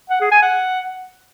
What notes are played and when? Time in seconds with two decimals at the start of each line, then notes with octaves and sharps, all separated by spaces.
0.10 F#5
0.20 G#4
0.31 G#5
0.42 F#5